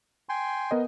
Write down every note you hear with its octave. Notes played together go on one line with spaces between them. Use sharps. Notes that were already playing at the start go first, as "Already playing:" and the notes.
G5 G#5 C6
B3 A#4 D#5